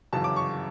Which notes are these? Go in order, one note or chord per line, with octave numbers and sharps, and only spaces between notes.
G1 F#2 C#3 E3 A5
D6
C#6